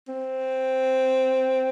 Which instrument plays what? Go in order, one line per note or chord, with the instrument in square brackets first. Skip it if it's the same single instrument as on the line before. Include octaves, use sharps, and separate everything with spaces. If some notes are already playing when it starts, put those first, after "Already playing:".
[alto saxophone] C4